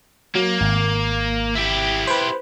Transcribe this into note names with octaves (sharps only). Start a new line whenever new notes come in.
F#3 A#3
G#1
E4 G4
B4 C5